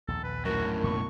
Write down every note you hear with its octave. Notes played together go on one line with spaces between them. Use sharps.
A#1 D#2 A4
B4
F#2 A2 F#4 A#4
B2 F#3 A#3 C#6